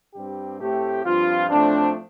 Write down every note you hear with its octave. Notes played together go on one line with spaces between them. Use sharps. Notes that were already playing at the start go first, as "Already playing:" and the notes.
G2 G3 C4 G4
A2 A3 C4 G4
G2 F3 C4 F4
A2 F3 A3 C4 D4